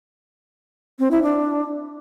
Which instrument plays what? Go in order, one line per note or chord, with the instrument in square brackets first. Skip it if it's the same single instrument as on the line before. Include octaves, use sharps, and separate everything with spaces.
[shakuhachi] C4
E4
D4